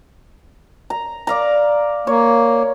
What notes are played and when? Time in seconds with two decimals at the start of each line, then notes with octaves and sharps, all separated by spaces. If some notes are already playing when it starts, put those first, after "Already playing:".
0.90 A#5
1.27 D5 F5 A#5
2.07 A#3 C#5